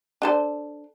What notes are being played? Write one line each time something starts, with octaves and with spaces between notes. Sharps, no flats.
D4 A4 C5